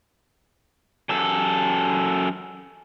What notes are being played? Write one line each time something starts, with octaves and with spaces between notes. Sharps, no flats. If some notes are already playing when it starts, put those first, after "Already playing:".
F#2 A4